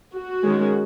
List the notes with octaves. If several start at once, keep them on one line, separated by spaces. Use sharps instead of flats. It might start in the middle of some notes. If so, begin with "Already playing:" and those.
F#4
D#3 G#3 C#4